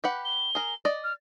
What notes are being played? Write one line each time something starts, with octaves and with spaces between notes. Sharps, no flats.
G4 B4 F#5
G7
G#4 A#4
D5 D#5
F6